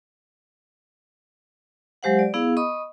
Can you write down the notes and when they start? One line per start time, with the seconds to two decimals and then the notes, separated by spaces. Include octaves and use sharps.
2.03 F#3 G#3 G4 C5 F5 F#5
2.19 D5
2.34 B3 E4 G#4 F5
2.57 D#5 B5 C#6 D#6